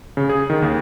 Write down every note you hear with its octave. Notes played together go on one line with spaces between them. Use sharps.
C#3
G#4
D#3
D#2